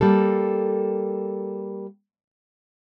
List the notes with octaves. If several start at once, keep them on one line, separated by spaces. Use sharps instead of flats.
G3 A#3 A4